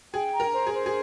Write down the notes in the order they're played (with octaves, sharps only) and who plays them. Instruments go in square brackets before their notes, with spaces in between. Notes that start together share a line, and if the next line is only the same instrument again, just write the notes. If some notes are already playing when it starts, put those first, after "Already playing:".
[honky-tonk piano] G#4 [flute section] G5
[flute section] A#5
[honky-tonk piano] A#4
[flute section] C5
[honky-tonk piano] G#4
[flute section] C5
[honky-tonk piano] G#4